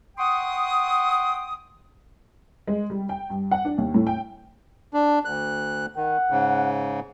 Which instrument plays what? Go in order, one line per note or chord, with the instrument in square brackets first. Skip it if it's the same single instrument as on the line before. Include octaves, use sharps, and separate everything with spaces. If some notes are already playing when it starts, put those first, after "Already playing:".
[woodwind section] F#5 G5 C6 C#6 D#6
[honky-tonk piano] G#3
G3
G5
G2
F#5
D4
D#2
A2
G5
[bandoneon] D4
D2 F#6
[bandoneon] D#3 [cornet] F#5
[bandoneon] G#2 C#3